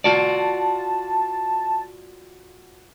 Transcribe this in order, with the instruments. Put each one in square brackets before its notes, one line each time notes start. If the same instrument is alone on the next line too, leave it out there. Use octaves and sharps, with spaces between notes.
[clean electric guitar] F4 F#4 D5 [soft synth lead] A5